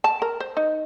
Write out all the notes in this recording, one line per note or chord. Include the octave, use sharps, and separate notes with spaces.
A5
A#4
C5
D#4